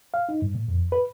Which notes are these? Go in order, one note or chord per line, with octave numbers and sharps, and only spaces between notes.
F5
D#4
G2
A#2
F2
B4